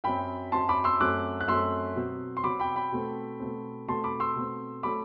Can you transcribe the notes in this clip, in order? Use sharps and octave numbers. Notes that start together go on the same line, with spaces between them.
F#2 F#3 C4 G5 B5
F#2 F#3 C4 A5 C6
B5 D6
C6 E6
F#2 F#3 A3 C4 D6 F#6
F#6
F#2 F#3 A3 C4 C6 E6
B2 F#3 C4
C6
B2 F#3 C4 B5 D6
G5 B5
G5 B5
B2 A3 C4
B2 A3 C4
B2 A3 C4 A5 C6
B5 D6
C6 E6
B2 A3 C4
F#3 A3 C4 B5 D6